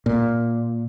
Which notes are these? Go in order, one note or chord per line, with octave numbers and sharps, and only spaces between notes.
A#2